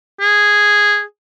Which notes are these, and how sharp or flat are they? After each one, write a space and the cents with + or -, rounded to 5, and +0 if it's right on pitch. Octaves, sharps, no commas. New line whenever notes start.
G#4 -5